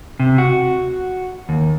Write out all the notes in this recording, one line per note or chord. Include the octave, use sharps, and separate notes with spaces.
C3
F#4
D#2